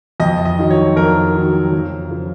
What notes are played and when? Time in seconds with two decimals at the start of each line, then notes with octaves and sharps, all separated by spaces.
0.20 F2 D#5
0.45 D#5
0.59 D#3 F#3
0.71 C#5
0.96 F2 A#4
1.35 D#3 F#3
1.72 F2
2.09 C#3 F3